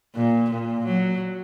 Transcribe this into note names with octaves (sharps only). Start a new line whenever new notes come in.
A#2
A#2
F#3